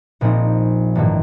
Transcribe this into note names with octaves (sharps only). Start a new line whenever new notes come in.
A#1 A#2 F3 C4 D#4
A1 G2 D#3 A#3